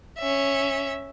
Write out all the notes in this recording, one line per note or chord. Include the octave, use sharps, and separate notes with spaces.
C#4 E5